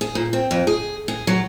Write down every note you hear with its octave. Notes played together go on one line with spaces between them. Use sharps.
G#4
A#2
C4
F2
G#4
G#4
F#3